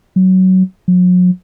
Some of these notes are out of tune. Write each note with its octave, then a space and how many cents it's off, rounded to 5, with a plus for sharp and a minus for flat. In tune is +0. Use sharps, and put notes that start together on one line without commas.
F#3 +15
F#3 -40